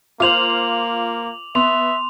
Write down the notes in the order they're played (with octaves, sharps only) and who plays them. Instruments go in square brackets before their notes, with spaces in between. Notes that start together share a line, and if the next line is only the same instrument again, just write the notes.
[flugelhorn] A#3 [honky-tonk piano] F4 C5 [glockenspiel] D6 F7 F#7
[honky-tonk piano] B3 [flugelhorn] E5 [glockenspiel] C6 F7